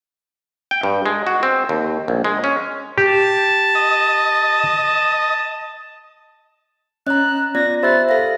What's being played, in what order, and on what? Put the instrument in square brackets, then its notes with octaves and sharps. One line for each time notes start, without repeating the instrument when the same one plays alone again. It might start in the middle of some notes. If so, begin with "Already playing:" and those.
[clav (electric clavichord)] G5
G2
G#3
F#4
C4
D#2
A#1
G#3
C#4
[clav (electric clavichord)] G4 [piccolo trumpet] A5
[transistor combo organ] D#5
[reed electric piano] C#4 [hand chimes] D#5 A#5 [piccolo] F#6
[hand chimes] B3 F4 D5 [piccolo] A#6
[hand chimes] G4 F#6 [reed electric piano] C5 E5 B5 [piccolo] A6
[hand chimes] A4 F5 [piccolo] A#6